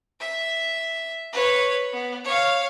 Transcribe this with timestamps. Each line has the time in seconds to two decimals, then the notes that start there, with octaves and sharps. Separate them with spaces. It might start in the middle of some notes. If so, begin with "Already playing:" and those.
0.20 E5
1.32 B4 C#5
1.92 B3
2.24 C#5 F5